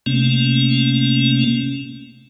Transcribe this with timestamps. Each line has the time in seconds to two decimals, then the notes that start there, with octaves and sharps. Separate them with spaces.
0.06 C3 A3 A#3 C#4